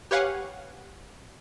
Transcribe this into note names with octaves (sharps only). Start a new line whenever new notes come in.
G4 B4 C#5 F5 F#5 G#5